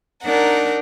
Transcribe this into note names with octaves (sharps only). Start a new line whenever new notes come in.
D4 D#4 A#4 F#5